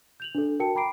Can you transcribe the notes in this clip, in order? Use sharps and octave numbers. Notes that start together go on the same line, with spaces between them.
G6 F7 F#7
D4 A4
F#4 A#4 G5 A5 C#7
G5 A#5 B5 D6 C7 D7